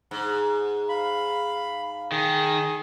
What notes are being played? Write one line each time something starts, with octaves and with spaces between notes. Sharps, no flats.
G#2
F5 B5
D#3 G#4